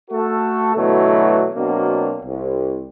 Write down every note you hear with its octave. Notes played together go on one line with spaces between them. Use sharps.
A3 F#4 A4
B2 D3 E3 F#3 A3
B2 F#3 A#3 C4 D4
C2